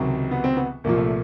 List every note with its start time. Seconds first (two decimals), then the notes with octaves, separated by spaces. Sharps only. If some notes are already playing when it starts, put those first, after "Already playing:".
Already playing: C#2 C3 D#3 F#3
0.31 B3
0.44 C4
0.57 B3
0.84 C2 A#2 F3 A#3
0.98 A3